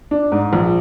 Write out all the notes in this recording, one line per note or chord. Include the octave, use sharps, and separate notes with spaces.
D4
G#2
A#1